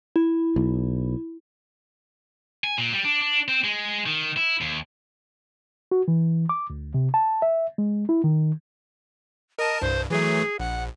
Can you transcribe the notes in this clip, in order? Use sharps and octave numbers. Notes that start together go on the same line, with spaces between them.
E4
B1
G#5
A#2
G3
D4
D4
C4
G#3
D#3
E4
D#2
F#4
E3
D6
D2
C3
A5
E5
G#3
E4
D#3
A#4 D#5 A5
C2 G2 C5
E3 F#3 A3 G#4
A#1 F#5